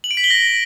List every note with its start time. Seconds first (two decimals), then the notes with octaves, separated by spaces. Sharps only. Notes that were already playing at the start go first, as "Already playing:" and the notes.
0.04 F#7
0.11 D7
0.17 B6
0.24 G7
0.31 A#6